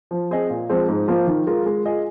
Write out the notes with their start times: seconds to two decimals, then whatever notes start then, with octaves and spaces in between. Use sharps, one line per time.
0.11 F3
0.31 C4 G#4 D#5
0.50 A#2
0.70 F3 G#3 C4
0.88 G#2
1.08 F3 A#3 F4 C5
1.27 D#3
1.47 G#3 F4 A#4
1.66 G#3
1.85 F4 G#4 D#5